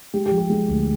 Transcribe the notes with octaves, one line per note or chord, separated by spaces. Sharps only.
G#3 G4
G4
F3
G4
G#3
D2